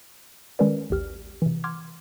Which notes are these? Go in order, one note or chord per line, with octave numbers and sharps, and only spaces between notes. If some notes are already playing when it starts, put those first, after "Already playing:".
D#3 G#3 C#4 A#4 B4 D5
A1 D#2 G4 F6
C3 E3
F#5 C6 D6 F6 G#6